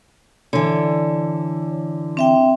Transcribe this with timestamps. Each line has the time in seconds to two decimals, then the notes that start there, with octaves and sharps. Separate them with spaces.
0.53 D3 E3 C#5
2.17 C4 E5 G5